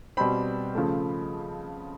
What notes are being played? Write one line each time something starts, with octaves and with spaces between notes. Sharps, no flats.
B2 G3 C4 B5
C#3 F3 A3